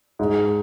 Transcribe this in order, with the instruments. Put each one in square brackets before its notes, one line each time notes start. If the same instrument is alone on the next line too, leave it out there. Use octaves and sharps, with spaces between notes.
[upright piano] G#2